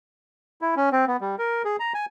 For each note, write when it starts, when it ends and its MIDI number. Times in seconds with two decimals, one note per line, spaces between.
0.62 0.75 64
0.76 0.89 61
0.92 1.05 60
1.07 1.17 59
1.21 1.36 55
1.39 1.62 70
1.65 1.77 68
1.80 1.93 82
1.94 2.06 80